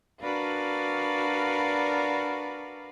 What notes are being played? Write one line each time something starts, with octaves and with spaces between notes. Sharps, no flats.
D4 F#4 A#4 B4 D5 F5